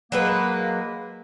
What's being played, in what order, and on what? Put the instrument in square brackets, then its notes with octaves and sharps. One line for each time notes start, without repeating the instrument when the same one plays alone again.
[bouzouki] F#3 G#3 B4 [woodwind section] A#3